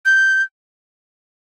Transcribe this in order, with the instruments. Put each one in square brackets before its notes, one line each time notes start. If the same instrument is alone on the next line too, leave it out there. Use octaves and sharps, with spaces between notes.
[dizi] G6